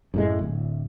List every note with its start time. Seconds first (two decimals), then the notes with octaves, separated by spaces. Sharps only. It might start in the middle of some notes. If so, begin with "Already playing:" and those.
0.14 F#2 A2 G#3
0.39 D1